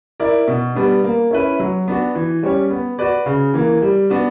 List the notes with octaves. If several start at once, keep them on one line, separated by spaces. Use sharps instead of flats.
E4 A#4 D5
B2
G3 B3 D4
A#3
C#4 E4 B4
F#3
B3 D4 F#4
E3
G3 C#4 G4 C#5
B3
F#4 B4 D5
C#3
E3 A#3
G3
B3 D4 F#4